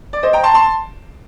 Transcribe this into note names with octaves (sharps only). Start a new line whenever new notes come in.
D5
C5 D#5
G5 A#5
A5 C6
A5 C6